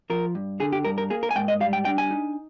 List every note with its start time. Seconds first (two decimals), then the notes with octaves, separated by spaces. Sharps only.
0.10 F3 A#4
0.35 G2
0.60 D3 G#4
0.73 G4
0.85 G2 A#4
0.98 A#4
1.10 A#3 G#4
1.23 A#4
1.31 G#5
1.35 G#2 G5
1.48 D#5
1.60 G3 F5
1.73 G5
1.85 D4 G5
1.98 G#5
2.11 D#4